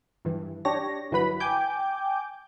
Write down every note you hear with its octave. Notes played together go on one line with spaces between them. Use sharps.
G2 E3
D4 G4 C#5 A#6
G1 E3 F#3 B4 B5
G5 G#5 D6 G6